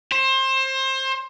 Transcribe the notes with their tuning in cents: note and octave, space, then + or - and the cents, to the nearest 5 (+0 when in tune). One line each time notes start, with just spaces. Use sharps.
C5 +25